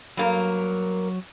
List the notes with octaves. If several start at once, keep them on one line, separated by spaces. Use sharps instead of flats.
G2 F#3 A#3 A#4